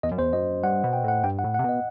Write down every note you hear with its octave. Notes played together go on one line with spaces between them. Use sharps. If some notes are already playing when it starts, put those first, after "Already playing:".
E2 D#5
F#2
E2 C5
F#2 D#5
G2 F#5
B2
G5
A2 F#5
G2 G5
F#5
A2
F#5
C3
B2 D#5